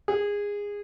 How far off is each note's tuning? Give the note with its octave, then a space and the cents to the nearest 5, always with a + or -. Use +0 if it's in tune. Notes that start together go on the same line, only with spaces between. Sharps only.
G#4 -20